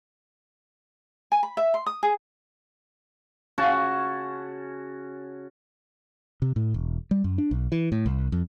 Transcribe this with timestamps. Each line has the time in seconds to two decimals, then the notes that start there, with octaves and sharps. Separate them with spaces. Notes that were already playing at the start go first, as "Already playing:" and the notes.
1.32 G#5
1.43 B5
1.57 E5
1.74 C6
1.86 D#6
2.03 G#4
3.58 C#3 F#4 G#5 A5
6.42 C3
6.56 A2
6.74 E1
7.11 G3
7.24 F#2
7.38 D4
7.51 B1
7.72 E3
7.92 A2
8.06 C2
8.32 F2